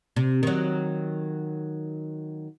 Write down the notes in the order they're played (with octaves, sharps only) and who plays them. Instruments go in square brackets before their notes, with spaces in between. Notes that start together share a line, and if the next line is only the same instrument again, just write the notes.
[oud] C3
D#3 F#3